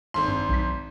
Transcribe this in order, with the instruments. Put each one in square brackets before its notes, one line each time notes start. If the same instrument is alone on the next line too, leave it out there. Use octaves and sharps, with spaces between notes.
[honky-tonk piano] G#1 C6
[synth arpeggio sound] G2
B1 B6